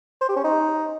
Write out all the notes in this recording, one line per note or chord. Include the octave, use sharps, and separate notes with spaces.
C5
G4
C#4
D#4